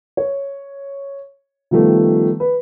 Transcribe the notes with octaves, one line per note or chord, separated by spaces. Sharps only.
C#5
D#3 F3 G3 A3 B3
B4